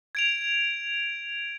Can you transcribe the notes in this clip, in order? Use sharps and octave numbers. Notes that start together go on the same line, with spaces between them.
G#6 D7 F7